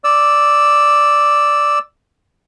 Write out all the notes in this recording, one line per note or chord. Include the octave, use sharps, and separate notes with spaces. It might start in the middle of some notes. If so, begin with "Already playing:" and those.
D5 E6